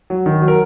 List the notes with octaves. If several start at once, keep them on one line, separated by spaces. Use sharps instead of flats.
F#3
D#3
F#3
A#4